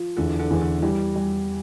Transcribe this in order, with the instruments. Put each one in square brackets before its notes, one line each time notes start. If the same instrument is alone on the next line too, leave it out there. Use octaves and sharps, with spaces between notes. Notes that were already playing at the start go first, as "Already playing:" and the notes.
Already playing: [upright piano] F3 [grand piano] F4
[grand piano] E2 [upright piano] D3
[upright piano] D3
[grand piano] E2 [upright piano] E3
[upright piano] D3
[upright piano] E3 [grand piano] G3
[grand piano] G3